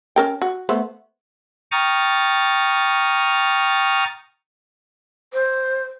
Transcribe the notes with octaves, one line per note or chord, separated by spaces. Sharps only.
C#4 A#4 G5
F#4
A3 B3 C5
G5 A#5 C#6 D#6 F6 A6
C5